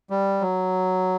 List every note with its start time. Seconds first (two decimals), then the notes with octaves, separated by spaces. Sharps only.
0.10 G3
0.41 F#3